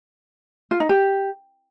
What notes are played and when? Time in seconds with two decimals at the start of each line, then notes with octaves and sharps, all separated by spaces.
0.71 F4
0.80 D#4
0.89 G4